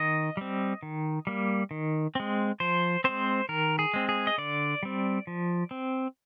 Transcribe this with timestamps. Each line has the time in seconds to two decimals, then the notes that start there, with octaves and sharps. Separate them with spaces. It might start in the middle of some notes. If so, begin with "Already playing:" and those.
Already playing: D#3 D#5
0.37 G3 C4
0.83 D#3
1.27 G3 A#3
1.71 D#3
2.15 G#3 C4
2.60 F3 C5
3.04 G#3 C4 C5
3.49 D#3 A#4
3.79 G#4
3.94 G#3 C4
4.09 G#4
4.27 D#5
4.38 D3 D5
4.83 G3 C4
5.27 F3
5.71 C4